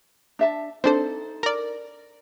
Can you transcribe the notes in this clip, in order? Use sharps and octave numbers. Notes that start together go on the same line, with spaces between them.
D4 E5 A5
C4 D4 D#4 A4 C5
A#4 D5